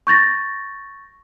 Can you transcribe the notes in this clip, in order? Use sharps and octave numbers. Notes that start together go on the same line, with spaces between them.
C#6 G6 A6 A#6